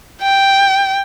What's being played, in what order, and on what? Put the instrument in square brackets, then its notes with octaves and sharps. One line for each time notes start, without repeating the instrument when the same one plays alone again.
[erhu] G5